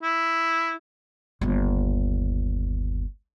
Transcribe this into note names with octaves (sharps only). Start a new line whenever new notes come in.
E4
G1 D#2